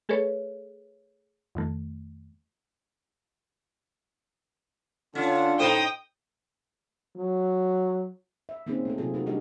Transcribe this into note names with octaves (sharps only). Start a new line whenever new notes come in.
A3 G#4 A4 B4 C#5
F2 D#3 A3
D3 C#4 D4 F4
A2 D#4 C5 G5 D#6
F#3
E5
A#3 C4 C#4 D#4 G#4
A3 A4
C3 F#3 F4 G#4
D#4 F#4 A#4
G3 D4 G4 G#4 D#5